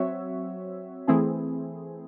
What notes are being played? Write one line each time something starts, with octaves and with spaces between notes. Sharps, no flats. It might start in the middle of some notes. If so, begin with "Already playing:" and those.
Already playing: F#3 C4 F#4 C#5 E5
E3 A3 C4 E4 G#4